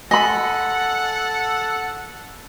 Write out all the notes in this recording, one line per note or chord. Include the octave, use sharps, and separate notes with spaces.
A4 D#5 F#5 G#5 B5